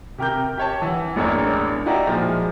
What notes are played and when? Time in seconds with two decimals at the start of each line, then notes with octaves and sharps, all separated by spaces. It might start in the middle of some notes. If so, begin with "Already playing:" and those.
0.18 C3 G4 A#4 D6 G6
0.58 G4 C#5 A5
0.82 E3 F#5
1.16 A1 E2 G#3 A#3 D4 C#5
1.86 D#4 E4 F#4 G4 D5 A#5
2.07 A#2 F3 G#3